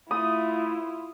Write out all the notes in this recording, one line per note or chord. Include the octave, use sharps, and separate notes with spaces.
A3 E4 F4 D#6